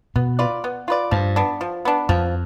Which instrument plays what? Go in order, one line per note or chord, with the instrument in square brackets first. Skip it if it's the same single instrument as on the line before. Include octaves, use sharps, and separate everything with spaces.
[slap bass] B2 [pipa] B3
[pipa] F4 B4 D5
B3
F4 B4 D5
[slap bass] G2 [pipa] F3
[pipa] B3 D4
F3
B3 D4
[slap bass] F2 [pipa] F3